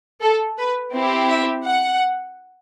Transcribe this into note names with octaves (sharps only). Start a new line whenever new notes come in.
A4
B4
C4 E4 G4
E5
F#5